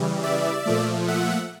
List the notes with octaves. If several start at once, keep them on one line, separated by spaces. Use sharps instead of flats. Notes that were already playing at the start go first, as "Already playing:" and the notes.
Already playing: C#3 E3 G3
D5 E5
A#2 F3 A3
E5 F#5